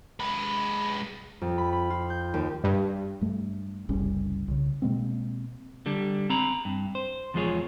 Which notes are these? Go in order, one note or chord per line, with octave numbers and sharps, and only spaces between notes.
G#3 B4
F2
B5
B5
F4
G6
D#2
G2
G2 A3
F#1 C2 G3 C#4
C2 C#3
B2 G#3 A#3 C4
D3 G3 D4
C4 A#5 B5
G2
C5
E2 F3 G#3 F4 G#4 C#5